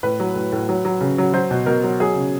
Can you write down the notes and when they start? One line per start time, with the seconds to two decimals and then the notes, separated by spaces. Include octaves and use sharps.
0.03 A2 B4
0.20 F#3
0.35 A2
0.52 A2
0.69 F#3
0.85 F#3
1.01 C#3
1.18 F#3
1.34 F#3 C5
1.51 B2
1.66 B2 A#4
1.84 F#3
2.00 F#3 G#4
2.15 C#3